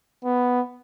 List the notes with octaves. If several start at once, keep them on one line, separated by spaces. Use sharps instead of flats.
B3